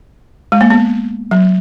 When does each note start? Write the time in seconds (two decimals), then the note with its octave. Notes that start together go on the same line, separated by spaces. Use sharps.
0.52 G#3
0.61 A#3
0.70 B3
1.31 F#3